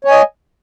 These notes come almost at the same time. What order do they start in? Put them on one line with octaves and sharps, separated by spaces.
C#5 G#5 D#5